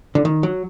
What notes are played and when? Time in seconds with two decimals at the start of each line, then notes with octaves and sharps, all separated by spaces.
0.15 D3
0.25 D#3
0.43 F#3